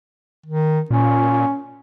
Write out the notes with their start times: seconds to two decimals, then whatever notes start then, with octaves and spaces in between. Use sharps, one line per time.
0.46 D#3
0.90 A#2 C#4